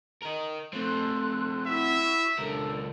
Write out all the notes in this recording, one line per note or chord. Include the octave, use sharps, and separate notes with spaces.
A#4 D#5
A3 C4 A4 C6 F#6
E4 F#4 E5
C#2 D4 A4 A#4